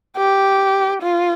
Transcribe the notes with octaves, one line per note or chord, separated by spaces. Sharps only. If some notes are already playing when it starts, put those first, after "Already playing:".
G4
F4